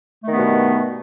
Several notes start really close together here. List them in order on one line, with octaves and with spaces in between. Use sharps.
A3 D#3 B3 G2 B2